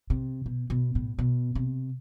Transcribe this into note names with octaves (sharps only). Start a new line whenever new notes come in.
C3
B2
B2
A2
B2
C3